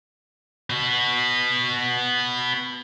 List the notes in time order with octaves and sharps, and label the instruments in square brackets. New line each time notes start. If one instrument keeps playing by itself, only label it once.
[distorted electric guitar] B3 F#4